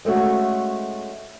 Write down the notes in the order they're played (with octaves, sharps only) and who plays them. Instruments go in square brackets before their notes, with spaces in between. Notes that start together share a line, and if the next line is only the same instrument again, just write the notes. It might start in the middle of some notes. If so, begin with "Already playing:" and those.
[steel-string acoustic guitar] G#3 A3 C#4 F#4